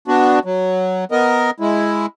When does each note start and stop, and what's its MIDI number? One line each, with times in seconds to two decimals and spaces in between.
0.08 0.39 59
0.08 0.39 62
0.08 0.39 66
0.45 1.05 54
1.11 1.51 59
1.11 1.51 70
1.11 1.51 75
1.60 2.06 56
1.60 2.06 64